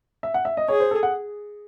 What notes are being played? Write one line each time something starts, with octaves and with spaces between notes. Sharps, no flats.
E5
F#5
E5
D#5
G#4 C#5
C5
A4
F#5